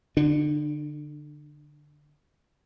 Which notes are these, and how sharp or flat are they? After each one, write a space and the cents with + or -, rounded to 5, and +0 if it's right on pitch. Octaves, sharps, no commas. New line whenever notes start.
D3 +0 D4 +40